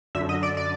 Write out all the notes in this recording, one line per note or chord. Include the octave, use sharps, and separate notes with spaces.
F#2 D3 E5
D#5
D5
D5